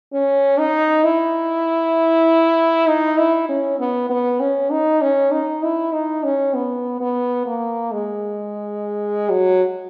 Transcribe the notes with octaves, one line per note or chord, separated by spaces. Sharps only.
C#4
D#4
E4
D#4
E4
C#4
B3
B3
C#4
D#4
C#4
D#4
E4
D#4
C#4
B3
B3
A#3
G#3
F#3